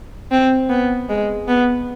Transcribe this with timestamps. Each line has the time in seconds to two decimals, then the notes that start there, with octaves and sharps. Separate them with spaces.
0.32 C4
0.70 B3
1.09 G#3
1.48 B3